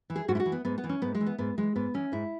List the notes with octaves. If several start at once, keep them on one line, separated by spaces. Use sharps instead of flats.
E3
G#4
G#2 F#4
E4
F#4
E3
B3
G#2 B3
B3
E3
C#4
G#2 B3
G#3
E3
B3
G#2 B3
E3 G#3
G#2 B3
E3 C#4
G#2 E4